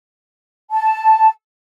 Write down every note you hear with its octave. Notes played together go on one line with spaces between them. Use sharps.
A5